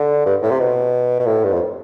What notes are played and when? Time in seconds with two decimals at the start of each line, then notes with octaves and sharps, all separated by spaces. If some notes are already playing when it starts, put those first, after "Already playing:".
Already playing: D3
0.26 G2
0.42 A2
0.50 C3
0.60 B2
1.20 B2
1.27 A2
1.44 G2
1.52 F2